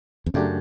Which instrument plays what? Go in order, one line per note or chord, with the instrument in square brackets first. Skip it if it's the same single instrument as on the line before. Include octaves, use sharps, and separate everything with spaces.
[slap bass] E2
[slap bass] F#2 [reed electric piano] C#3 F#3 A3 D4 G4